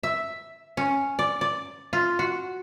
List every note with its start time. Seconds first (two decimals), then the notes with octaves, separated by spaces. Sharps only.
0.03 E5
0.77 C#4
1.19 D5
1.41 D5
1.93 F4
2.19 F#4